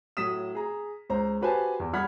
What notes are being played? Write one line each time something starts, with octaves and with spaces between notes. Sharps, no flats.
A2 F#3 D#6 B6 E7
G#4 A#5
C#2 C5 A#5
F#4 G4 B4 C5 G#5 A5
E2
G3 F#5 B5 F6 G#6 B6